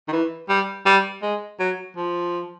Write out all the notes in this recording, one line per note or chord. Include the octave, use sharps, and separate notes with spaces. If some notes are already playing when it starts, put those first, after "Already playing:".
D#3
E3
G3
G3
G#3
F#3
F3